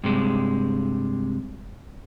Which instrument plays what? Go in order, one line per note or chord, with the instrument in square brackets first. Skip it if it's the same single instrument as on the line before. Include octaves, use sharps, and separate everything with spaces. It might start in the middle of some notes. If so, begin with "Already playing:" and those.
[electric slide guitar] G2 C3 G#3